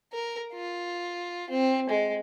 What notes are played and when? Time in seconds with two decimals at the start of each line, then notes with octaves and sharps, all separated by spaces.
0.12 A#4
0.54 F4
1.50 C4
1.90 G#3